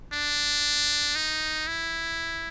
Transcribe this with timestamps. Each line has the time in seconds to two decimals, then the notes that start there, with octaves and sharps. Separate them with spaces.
0.13 D4
1.15 D#4
1.67 E4